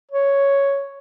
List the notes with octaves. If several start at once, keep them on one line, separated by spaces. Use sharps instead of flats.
C#5